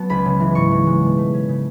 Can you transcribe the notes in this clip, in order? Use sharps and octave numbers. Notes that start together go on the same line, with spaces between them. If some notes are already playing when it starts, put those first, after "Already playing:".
Already playing: F#3 B3 C#4 A5
C#2 B5
C#3
E3
G#2 C#6
E3
G#3
B2
A3
C#4
C#3